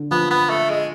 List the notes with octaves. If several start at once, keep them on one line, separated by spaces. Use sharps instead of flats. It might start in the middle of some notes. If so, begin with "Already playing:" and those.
Already playing: D3
F3 B3
B3
A3
G#3